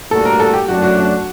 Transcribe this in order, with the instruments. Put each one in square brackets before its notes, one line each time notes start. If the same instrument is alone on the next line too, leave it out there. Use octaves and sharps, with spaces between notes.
[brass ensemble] A2 G3 A#3 D4 F#4 [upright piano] A4
[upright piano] A#4
A4
G4
[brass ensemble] F#2 F#3 A3 D4 [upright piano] F#4
[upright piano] F#4
F#4